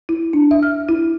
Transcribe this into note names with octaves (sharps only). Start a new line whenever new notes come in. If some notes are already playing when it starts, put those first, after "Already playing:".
E4
D4
E5
F6
E4